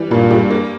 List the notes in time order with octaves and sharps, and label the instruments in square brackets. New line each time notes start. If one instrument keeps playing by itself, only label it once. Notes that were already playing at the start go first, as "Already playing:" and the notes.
Already playing: [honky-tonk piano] E3 G3
[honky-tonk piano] G2 [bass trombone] A#2
[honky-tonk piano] G3
A#3